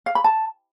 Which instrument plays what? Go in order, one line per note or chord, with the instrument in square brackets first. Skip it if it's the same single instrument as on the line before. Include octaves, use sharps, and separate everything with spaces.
[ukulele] F5
B5
A5